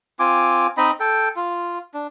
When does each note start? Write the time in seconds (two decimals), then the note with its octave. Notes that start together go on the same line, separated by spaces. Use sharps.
0.19 C4 F4 G#5 D6
0.77 C4 D#4 D#5 B5
1.00 A4 G5
1.36 F4
1.94 D4